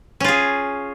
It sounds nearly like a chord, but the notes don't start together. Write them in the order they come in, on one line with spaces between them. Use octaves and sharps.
C#4 F4 G#4